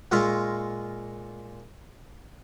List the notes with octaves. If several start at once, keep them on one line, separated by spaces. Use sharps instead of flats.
A#2 G#3 F4 E5 F5 C#6